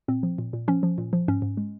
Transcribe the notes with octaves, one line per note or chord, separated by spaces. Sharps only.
A#2 C4
F3
A#2
A#2
F3 C#4
F3
A#2
F3
G#2 C#4
G#2
G#3